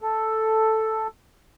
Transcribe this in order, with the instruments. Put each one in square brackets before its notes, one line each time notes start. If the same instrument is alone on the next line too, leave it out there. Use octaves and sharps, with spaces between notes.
[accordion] A4